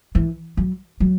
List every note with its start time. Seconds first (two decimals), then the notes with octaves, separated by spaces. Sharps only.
0.15 E3
0.57 F#3
1.00 F#3